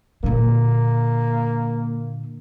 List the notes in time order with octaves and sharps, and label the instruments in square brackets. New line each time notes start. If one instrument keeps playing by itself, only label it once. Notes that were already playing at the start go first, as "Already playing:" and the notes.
[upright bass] A#2 D3 [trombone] A#3